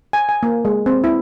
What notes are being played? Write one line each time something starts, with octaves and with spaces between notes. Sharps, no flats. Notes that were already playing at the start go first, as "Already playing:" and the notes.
G#5
G#5
A#3
G#3
C4
E4